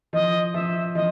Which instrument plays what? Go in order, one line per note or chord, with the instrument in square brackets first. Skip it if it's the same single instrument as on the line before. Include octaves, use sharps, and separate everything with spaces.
[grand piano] F3 [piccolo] D#5
[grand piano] F3 [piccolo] E5
[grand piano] F3 [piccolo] D#5